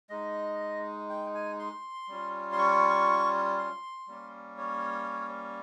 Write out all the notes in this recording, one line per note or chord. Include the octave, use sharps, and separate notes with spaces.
G#3 D#4 D#5
G5
G#5
C6
G3 C#4 F4
C6
C#6
C6
G3 A#3 C#4
C#5